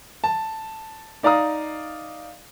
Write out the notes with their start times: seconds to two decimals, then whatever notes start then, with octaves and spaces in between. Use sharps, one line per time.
0.24 A5
1.23 D#4 D5 F5 A#5 D#6